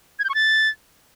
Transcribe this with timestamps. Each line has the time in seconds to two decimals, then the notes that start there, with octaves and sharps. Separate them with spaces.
0.19 G#6
0.24 G6
0.29 C#6
0.35 A6